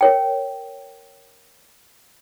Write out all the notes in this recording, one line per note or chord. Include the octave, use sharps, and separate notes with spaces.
A#4 C#5 G5